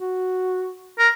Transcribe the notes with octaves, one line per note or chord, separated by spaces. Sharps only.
F#4
A#4